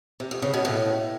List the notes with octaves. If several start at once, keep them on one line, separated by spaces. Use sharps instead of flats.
C3
F2
C#3
B2
A2